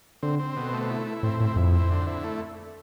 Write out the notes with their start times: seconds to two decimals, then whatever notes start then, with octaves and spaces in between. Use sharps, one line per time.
0.23 D3 C4
0.39 C4
0.56 B2
0.73 A3
0.90 E4
1.07 E4
1.23 A2 C4
1.40 A2 E4
1.56 F2 E4
1.73 C4
1.90 D3
2.07 E4
2.24 A3